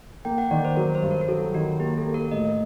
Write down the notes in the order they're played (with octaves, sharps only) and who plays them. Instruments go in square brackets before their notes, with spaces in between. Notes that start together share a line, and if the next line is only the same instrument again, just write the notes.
[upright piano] A#3 [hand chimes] G5
[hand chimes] F#5
[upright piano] D#3 [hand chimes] D5
[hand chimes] C5
[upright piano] F#3 [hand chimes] A#4
[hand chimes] C5
[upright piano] G2
[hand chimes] A#4
A#4
[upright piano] F#3 [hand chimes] A4
[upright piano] D#3 [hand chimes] F#4
[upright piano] A#3 [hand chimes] G4
[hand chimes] A4
[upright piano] A#3
[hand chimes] A#4
[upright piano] A2 [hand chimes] D#5